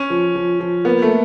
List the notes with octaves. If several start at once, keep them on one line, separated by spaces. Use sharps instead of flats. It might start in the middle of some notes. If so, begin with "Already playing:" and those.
Already playing: C#4
F3
F3
F3
A#3 B3
A3